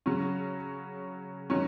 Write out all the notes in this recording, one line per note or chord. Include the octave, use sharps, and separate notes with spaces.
C#3 F#3 C#4
D#3 F#3 C#4